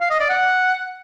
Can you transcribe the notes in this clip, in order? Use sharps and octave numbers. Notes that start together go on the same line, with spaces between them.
F5
D#5
D5
F#5